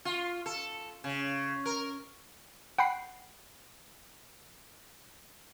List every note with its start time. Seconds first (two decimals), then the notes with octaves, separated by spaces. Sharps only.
0.05 F4
0.46 A4
1.04 C#3
1.66 A#4
2.78 F#5 G5 B5 C7